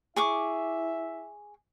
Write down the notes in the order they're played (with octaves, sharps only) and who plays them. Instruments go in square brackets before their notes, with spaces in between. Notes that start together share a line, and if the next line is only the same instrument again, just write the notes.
[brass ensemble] E4 E5 [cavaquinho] G#4 C#6 D6